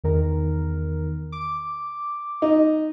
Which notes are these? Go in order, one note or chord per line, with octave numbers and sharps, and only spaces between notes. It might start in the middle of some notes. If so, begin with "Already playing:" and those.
E2 D#3 A#4
D6
D#4